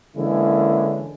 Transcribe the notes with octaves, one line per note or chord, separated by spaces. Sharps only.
D3 E3 G#3 A#3 C#4 E4